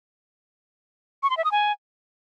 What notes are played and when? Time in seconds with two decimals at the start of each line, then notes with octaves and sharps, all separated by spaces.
1.23 C#6
1.30 C6
1.37 E5
1.44 D#6
1.52 G#5